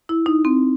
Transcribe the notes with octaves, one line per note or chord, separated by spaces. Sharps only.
E4
D#4
C4